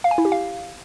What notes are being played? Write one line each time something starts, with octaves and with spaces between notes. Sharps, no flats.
F5
G#5
E4
G4
F5